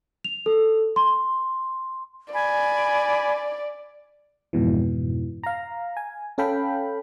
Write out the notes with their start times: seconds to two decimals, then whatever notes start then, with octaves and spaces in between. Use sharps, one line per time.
0.24 F7
0.46 A4
0.96 C6
2.33 D5 G#5 B5
4.53 F2 G#2 B2 E3
5.43 F5 A#5
5.97 G#5
6.38 C#4 A4 F5 G5 B5